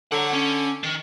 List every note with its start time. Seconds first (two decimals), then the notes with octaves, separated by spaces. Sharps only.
0.12 D3 C#5 F#5
0.33 C#4
0.83 D#3